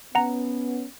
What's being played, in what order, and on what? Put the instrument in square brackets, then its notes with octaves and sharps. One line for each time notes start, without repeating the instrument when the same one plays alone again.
[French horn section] B3 C#4 [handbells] F#5 A#5